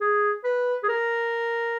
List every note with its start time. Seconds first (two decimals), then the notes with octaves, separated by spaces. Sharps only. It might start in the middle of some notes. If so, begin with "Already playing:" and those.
0.01 G#4
0.44 B4
0.83 G#4
0.89 A#4